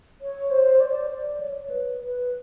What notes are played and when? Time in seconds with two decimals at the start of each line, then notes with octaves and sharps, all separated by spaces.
0.21 C#5
0.51 C5
0.80 D5
1.10 D5
1.40 C#5
1.70 B4
2.00 B4